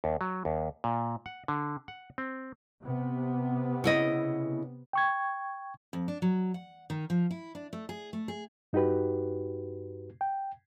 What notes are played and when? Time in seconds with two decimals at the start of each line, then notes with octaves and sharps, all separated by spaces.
0.04 D#2
0.21 F#3
0.45 D#2
0.84 A#2
1.26 F#5
1.48 D3
1.88 F#5
2.18 C4
2.81 C3 B3
3.84 C#3 E4 D#5
4.93 G5 C#6 G#6
5.93 F2
6.08 D4
6.22 F#3
6.54 F#5
6.90 D#3
7.10 F3
7.31 E4
7.55 D4
7.73 A3
7.89 G#4
8.13 A3
8.28 G#4
8.73 G2 D#4 F#4 G4 B4
10.21 G5